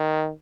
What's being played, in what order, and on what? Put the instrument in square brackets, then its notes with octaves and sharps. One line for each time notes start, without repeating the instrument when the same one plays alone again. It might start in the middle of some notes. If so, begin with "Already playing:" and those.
Already playing: [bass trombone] D#3